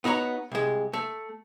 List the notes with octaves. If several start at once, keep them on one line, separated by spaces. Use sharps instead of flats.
B3 D#4 F#4 C#5 A#5
C2 G#3
A3